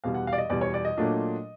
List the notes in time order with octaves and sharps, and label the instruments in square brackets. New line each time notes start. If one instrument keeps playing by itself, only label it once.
[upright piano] E2 B2 G3 F5
F#5
F5
D5
D#5
E2 B2 G3 D5
C#5
D5
D#5
A#2 F#3 A3 D4 F4